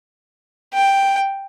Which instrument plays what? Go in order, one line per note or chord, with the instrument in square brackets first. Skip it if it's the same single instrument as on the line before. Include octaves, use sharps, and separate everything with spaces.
[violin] G5